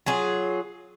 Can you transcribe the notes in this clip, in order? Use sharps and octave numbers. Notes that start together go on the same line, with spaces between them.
F#3 F4 G#4